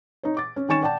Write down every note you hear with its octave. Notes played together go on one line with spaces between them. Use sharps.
D#4 C#5
D6 A6
C#4
D#3 C#4 G#5 C#6 A6 E7
D5 F#5 G5 A5